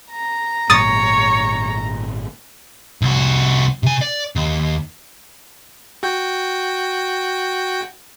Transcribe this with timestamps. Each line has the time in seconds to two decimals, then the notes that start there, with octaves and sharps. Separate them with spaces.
0.11 A#5
0.70 G#1 A#2 F#3 C#5 D#6 A6
3.02 C2 F#4
3.83 C3 G#5
4.01 D5
4.36 D#2
6.03 F#4 G5